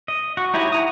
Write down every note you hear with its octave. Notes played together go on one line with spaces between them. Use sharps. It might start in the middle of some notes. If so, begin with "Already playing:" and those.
D#5
F#4
D#4 E4 G4 C#5
F#5 A#5 D#6